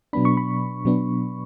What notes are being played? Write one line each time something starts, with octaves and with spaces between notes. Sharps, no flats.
B2 F#3 B3 D4 B5
C#6
B5
B2 F#3 B3 D4